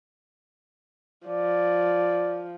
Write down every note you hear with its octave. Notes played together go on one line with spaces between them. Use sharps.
F3 D5